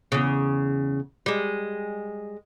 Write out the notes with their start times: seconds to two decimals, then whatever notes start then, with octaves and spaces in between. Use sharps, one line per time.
0.12 E2 C#3
1.26 G3 G#3